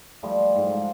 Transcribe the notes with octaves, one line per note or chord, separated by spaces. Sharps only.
F3 G3 A3
G#2
A4 F5